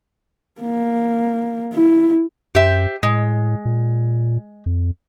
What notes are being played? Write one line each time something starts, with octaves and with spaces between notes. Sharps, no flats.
A#3
E4
F#2 G4 C5 E5
A2 G#3
A#2
F2